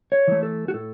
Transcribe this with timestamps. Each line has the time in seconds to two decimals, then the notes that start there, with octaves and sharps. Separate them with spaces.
0.12 C#5
0.28 E3 A3
0.43 A4
0.68 F#4
0.74 A2 A4